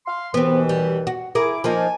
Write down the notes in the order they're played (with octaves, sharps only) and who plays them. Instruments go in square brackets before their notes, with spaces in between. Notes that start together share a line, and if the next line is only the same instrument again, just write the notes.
[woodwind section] F5 C6
[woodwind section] D#2 B2 E3 [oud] B3 C4
[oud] G3
F#4
[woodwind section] E4 D6 [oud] G#4 A#4
[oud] F3 A#3 D#4 [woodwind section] G#5 A5